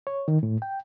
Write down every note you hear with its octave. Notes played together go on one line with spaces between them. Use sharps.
C#5
D#3
A2
G5